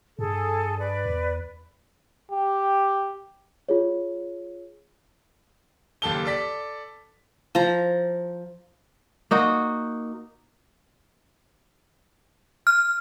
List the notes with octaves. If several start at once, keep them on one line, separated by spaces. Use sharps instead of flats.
G2 G#4 A4
B4 D5
E2
G4
F4 G#4 C#5
F#1 D#2 G4 A4 A5 G7
A4 D5 B6
F3 A#5
A#3 D#4 F#4
F6